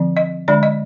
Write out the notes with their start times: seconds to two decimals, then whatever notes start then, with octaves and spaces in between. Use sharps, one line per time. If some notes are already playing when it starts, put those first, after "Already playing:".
Already playing: D3 F3 C4
0.17 D#5
0.48 D3 G#3 D4 D5
0.63 D#5